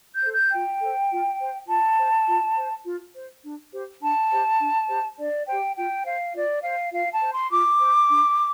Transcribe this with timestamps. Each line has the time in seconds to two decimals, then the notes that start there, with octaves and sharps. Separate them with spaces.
0.13 G6
0.23 A4 C5
0.32 G6
0.52 F4 G5
0.80 A4 C5
1.11 F4
1.39 C5
1.68 F4 A5
1.97 C5
2.26 F4
2.56 C5
2.85 F4
3.14 C5
3.43 D4
3.72 G4 C5
4.01 D4 A5
4.31 G4 C5
4.59 D4
4.88 G4 C5
5.17 D4 D5
5.47 G4 C5 G5
5.76 F4 G5
6.05 C5 F5
6.34 F4 D5
6.63 C5 F5
6.92 F4 F5
7.11 A5
7.21 C5
7.32 C6
7.51 F4 D6
7.80 C5
8.09 D4